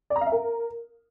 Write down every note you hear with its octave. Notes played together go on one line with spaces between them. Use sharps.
D5
A#5
F5
E5
A#4